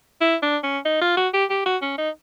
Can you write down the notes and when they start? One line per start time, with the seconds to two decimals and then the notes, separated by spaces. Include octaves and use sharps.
0.21 E4
0.42 D4
0.63 C#4
0.85 D#4
1.01 F4
1.17 F#4
1.34 G4
1.50 G4
1.66 F#4
1.82 C#4
1.98 D#4